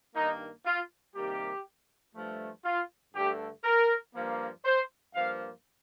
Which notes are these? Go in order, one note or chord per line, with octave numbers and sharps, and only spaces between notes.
G2 D#3 A#3 D#4
F4
C3 D#3 G3 A#3 G4
G2 F3 A3
F4
G2 D3 A3 G4
A#4
G2 F3 A#3
C5
G2 F3 A#3 F5